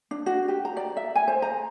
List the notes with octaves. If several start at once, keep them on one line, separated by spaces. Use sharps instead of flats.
D4
F#4
G4
A#5
D5
E5
G#5
C5
A#5